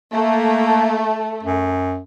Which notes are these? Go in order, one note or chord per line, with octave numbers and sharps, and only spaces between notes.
A3 A#3
F#2